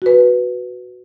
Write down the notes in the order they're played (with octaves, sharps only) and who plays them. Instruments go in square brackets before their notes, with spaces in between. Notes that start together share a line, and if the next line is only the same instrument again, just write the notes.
[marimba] F#4 B4